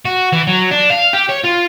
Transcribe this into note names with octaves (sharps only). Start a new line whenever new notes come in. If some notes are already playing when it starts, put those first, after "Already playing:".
F#4
E3
F#3
D4
F5
G4
C#5
F4